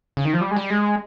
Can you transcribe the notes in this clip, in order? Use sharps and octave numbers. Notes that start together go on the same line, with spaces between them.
C#3
D#3
F3
G3
G#3
G3
G#3